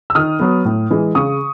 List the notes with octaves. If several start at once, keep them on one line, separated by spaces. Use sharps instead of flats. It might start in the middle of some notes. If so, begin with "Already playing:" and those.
E6
D#3 D#6 F6
F#3 B3
A2
E3 G#3
C#3 C#6 D#6